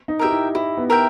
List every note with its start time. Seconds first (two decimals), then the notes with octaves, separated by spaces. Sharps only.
0.08 D#4
0.19 G4 A#4 E5 G5
0.31 E4
0.55 E4 G4
0.78 B3
0.90 A#4 E5 G5